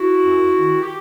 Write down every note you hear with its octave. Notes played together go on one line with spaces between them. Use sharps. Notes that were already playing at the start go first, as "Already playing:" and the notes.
Already playing: E4 F#4
F#2
D#3
G4